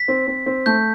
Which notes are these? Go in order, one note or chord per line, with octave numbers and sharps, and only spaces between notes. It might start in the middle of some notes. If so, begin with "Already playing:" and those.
Already playing: B6
C4
C4
C4
A3 G6